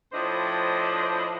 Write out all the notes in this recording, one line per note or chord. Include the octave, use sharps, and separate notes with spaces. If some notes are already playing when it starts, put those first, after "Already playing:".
A2 F3 D4 E4 C5 D#5